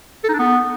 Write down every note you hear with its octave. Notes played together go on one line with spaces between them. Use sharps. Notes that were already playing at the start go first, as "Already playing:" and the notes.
A4
D#4
D4
B3